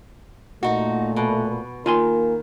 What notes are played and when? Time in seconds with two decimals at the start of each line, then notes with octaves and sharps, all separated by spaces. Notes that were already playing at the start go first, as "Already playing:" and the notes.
0.63 A#2 A3 D#4 F#4
1.16 B2
1.86 D#3 A#3 F4 A#4 G#5 C6